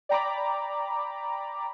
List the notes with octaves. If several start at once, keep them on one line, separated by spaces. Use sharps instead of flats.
D5 G5 A#5 B5 D6